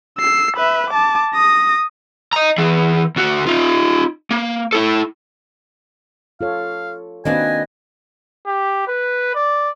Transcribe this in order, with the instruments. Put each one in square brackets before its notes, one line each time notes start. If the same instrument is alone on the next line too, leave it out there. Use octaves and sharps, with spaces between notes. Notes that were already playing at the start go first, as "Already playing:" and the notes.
[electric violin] E6 C7
B4 E5
A5 D6
D#6 A#6
[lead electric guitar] D#5 A#5
E3 G#4
D2 F#4
D#4 F4
A#3
E4 A4
[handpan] F4 A4 C#5 [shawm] F5
[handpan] D#3 C4 B4 [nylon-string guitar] A#3 D4 F#4 [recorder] D#5 [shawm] G#5
[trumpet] G4
B4
D5